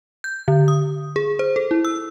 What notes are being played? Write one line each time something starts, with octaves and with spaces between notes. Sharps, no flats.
G6
D3
D#6
G#4
C5
A4
E4
E6